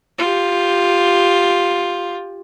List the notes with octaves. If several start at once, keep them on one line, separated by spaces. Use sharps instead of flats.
F4 G4